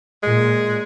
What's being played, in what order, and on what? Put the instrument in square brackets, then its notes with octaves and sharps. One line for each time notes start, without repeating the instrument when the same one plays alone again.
[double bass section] A#2 [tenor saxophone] G#3